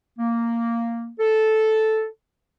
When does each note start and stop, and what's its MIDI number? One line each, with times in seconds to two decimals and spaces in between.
0.18 1.11 58
1.20 2.06 69